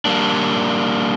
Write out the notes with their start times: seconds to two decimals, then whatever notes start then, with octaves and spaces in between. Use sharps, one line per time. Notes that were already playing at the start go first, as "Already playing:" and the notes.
0.05 G3 A#3 D4